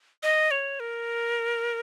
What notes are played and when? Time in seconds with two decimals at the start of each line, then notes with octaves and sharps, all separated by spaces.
0.23 D#5
0.51 C#5
0.80 A#4